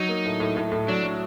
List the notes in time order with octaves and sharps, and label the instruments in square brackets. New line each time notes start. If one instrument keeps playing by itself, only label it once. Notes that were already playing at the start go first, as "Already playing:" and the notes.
Already playing: [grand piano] F#3 [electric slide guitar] D#4
[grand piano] A#3
A2
A2
A2
A2
[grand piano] F#3 [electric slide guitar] D4
[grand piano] F#3